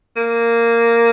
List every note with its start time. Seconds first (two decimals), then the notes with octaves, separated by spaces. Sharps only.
0.16 A#3